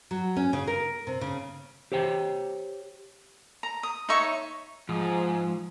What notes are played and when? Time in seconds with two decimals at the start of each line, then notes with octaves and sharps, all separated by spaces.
0.11 F#3
0.36 C#4
0.53 C#3
0.67 A#4
1.07 C3
1.21 C#3
1.92 G4 C5 C#5 G5
3.63 A#5
3.83 D#6
4.09 D#4 C#5 E5 C#6
4.89 G#2 F3